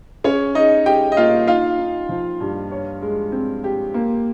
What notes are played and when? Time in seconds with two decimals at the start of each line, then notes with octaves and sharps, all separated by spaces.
0.24 C#4 G#4 C#5
0.55 D#4 G#4 D#5
0.86 G4 G#4 G5
1.12 D#5
1.17 A#3 F4 F5
1.47 D#4 F4 F5
1.79 D#4
2.09 F3
2.40 G2
2.72 C#5
3.02 G#3
3.32 C4
3.64 G4
3.94 A#3